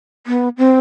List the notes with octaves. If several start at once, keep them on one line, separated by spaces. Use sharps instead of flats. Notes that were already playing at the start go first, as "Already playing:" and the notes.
B3
C4